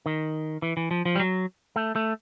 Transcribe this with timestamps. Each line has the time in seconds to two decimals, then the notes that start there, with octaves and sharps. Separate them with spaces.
0.06 D#3
0.62 E3
0.77 E3
0.91 F3
1.06 F3
1.16 G3
1.20 F#3
1.76 A3
1.96 A3